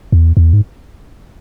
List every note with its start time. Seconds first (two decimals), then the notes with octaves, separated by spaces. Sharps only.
0.12 E2
0.37 E2
0.53 G#2